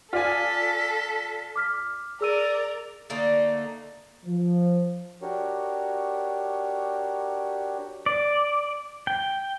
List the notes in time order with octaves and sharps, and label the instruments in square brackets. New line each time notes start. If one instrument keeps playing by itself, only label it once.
[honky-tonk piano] F4 D5 G#5 [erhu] A4 [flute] B6
[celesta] D6 F6 B6
[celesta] G#4 E6 D#7 [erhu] A#4 [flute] D5
[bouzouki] D3 A3 A#3 D#4
[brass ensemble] F3
[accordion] D4 F#4 G4 A#4 C#5
[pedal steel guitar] D5
G5